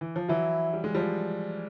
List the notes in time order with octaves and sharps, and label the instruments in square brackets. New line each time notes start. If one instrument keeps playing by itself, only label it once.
[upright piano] E3
F3
[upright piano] E3 F#3 [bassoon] E4
[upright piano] G3
G#3
F3 G3